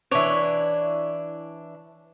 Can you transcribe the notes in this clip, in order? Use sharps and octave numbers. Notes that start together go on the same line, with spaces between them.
E3 D4 C#5